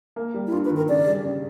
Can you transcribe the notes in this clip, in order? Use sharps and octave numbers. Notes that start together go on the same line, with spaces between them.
A#3
G3
E4
G2 F4
B4
D#3
A#4
C#3 D5
G3
C#3